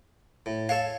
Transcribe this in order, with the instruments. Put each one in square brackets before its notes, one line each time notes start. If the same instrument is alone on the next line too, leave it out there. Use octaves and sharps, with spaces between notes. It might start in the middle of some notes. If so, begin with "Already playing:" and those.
[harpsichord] A2
[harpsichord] A4 C#5 G#5 [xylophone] F5